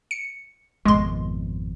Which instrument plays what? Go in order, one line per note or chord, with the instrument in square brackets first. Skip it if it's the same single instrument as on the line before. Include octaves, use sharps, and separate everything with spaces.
[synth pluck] C#7
[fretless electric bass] G#1 F2 B2 [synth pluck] G#3 C6